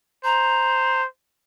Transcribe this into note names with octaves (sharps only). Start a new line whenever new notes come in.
C5 A#5